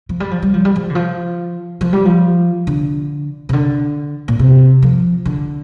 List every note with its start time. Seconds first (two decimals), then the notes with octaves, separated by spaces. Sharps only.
0.09 F3
0.20 G3
0.31 F3
0.42 G3
0.54 F3
0.65 G3
0.76 F3
0.90 D3
0.95 F3
1.81 F3
1.93 G3
2.05 F3
2.67 D3
3.49 C3
3.53 D3
4.28 A#2
4.39 C3
4.82 F3
5.25 D3